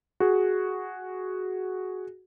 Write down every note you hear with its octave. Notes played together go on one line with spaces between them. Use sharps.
F#4 G#4